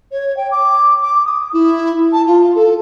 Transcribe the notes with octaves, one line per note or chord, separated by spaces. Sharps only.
C#5
G5
D6
D6
D#6
E4
A5
F4
A4